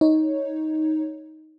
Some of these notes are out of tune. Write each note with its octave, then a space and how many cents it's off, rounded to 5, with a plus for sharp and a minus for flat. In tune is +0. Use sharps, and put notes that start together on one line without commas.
D#4 +10 C#5 +0